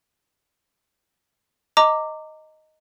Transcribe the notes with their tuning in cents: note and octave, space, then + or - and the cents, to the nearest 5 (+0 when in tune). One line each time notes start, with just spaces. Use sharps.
D#5 +0 A#5 -25 D6 +0